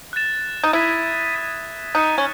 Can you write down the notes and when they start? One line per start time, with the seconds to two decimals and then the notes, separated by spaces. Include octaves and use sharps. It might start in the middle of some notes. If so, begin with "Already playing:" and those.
0.13 F#6 A6 E7
0.64 D#4
0.73 E4 D#6 G#6 B6 D#7
1.35 D#6 G#6 B6 D#7
1.95 D#4 D#6 F#6 C#7 E7
2.18 C#4